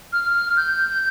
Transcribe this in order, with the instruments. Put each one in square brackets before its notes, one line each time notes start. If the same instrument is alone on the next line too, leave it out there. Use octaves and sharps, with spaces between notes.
[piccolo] F6
F6
G6